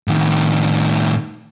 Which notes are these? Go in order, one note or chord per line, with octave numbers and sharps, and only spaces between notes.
A2 D#3